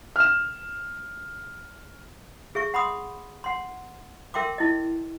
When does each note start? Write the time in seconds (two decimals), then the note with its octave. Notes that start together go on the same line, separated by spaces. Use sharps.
0.16 F6 E7
2.55 G#4 E5 C#6
2.74 F#5 B5 C6 D#6
3.44 F#5 C6
4.34 A#4 E5 G5 C6 D6
4.58 E4 D#5